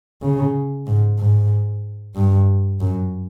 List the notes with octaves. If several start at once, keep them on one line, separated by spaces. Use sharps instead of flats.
C#3
G#2
G#2
G2
F#2